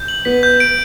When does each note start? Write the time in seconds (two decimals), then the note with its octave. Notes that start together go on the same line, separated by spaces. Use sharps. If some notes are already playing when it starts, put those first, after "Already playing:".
Already playing: G6
0.08 F#7
0.25 B3 B6
0.43 G6
0.60 D7